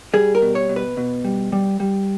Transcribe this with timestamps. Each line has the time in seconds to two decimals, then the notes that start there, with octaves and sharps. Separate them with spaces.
0.14 G3 G#4
0.35 A#4
0.42 B2
0.55 C#5
0.69 B2
0.76 B4
0.97 B2
1.24 G3
1.52 G3
1.80 G3